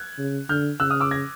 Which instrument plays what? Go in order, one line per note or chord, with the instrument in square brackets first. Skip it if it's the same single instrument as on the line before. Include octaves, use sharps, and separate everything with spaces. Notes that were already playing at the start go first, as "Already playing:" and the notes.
Already playing: [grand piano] F#6 G#6
[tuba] C#3
[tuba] D3 [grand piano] F6 G6
[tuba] C#3 [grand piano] E6 F#6
[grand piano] D#6 F6
D6 E6
G#6 A#6